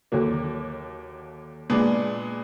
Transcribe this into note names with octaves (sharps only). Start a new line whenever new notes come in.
D#2 D3 F#3 A#3
A#2 G#3 B3 D4